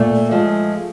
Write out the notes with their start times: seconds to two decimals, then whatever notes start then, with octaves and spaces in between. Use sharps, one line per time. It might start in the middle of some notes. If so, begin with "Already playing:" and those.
Already playing: A#2 A3
0.31 F3 G#3